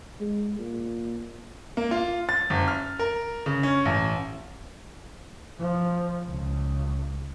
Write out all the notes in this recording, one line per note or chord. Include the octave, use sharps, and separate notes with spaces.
G#3
A#2
A#3
F4
A6
F#1
F6
A#4
C#3
C#4
A1
F3
C#2